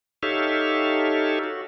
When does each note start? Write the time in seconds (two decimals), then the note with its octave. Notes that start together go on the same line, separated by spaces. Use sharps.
0.23 D#4 G4 A4 C#5 E5 F5
1.44 F#4